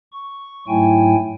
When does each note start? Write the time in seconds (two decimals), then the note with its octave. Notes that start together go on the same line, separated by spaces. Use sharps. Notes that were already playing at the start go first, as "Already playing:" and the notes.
0.12 C#6
0.68 G#2 F#3 A3 E4 G5 G#5